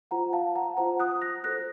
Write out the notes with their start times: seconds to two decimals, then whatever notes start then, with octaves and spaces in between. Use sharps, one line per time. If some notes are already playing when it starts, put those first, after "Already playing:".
0.11 F4 C5 F#5 A#5
0.33 F5 A5
0.56 F#5 A#5
0.77 F4 C5 F#5 A#5
1.00 D#6 F#6
1.22 F#6 A#6
1.43 F#4 A4 C5 F#6 A#6